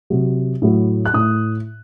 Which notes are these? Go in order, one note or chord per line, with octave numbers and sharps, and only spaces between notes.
C3 F#3
A2 F#3
F#6
A2 D#6